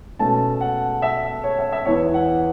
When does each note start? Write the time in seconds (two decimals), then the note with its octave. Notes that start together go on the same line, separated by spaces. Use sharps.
0.19 B2 A3 C#4 A5
0.61 F#5
1.02 E5
1.44 C#5
1.58 E5
1.72 E5
1.85 E2 E3 B3 C#5
2.14 F#5